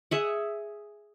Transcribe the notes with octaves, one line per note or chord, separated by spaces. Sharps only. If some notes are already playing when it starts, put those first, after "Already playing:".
G#4 E5 F#5